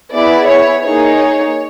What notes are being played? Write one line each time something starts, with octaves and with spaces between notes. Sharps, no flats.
B3 E4 G#4 D5
C#5
A#3 D#4 G#4 C#5